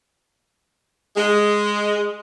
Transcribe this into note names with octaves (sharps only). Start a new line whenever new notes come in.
G#3